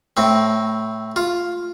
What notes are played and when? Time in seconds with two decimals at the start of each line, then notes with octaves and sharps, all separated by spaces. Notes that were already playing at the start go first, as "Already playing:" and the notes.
0.17 A2 C4
1.16 F4